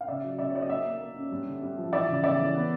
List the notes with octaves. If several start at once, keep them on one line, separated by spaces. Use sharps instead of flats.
F5
C#3 D5 E5
F#3
C#3 D5 E5
C#5
F#3 D5
D#5
A#3 D5 E5
A#3
A#3
C#4
G2
D3
G2
F3
E3 D5 E5
C#3
C#3 D5 E5
E3
B3